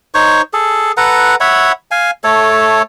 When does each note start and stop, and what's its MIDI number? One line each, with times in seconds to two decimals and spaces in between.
0.15 0.42 63
0.15 0.42 72
0.15 0.42 73
0.15 0.42 85
0.53 0.92 68
0.53 0.92 69
0.97 1.35 69
0.97 1.35 71
0.97 1.35 78
0.97 1.35 82
1.40 1.72 73
1.40 1.72 76
1.40 1.72 78
1.40 1.72 83
1.91 2.11 77
1.91 2.11 80
2.24 2.82 57
2.24 2.82 69
2.24 2.82 73